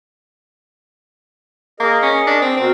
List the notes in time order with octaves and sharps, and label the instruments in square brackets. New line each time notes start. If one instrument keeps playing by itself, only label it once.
[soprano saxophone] A#3 [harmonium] G#4 A#4 D#5
[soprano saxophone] C#4
D4
C4
[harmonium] B2 F#4 A#4 [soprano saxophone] C4